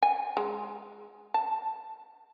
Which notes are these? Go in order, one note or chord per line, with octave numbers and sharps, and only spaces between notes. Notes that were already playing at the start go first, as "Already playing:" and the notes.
G#5
G#3
A5